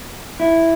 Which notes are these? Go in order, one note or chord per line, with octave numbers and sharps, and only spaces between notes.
E4